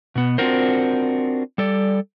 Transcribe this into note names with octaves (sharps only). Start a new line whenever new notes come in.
B2 B3
C4 D4 F4 F#4 A#4 C5
G3 A4 D5